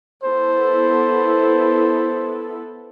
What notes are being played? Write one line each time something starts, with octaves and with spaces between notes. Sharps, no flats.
B3 E4 A4 C5